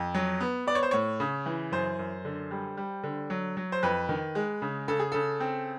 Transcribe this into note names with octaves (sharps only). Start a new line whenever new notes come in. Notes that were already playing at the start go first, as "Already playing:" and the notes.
Already playing: F2
F#3
B3
B3 D5
C#5
C5
A2 C#5
C#3
E3
F#2 C5
F#2
D3
G3
G3
D3
F#3
F#3
C5
F2 B4
D#3
G#3
C#3
C#3 A4
G#4
C#3 A4
C4